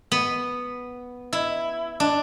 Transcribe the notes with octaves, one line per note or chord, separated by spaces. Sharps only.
B3
E4
D4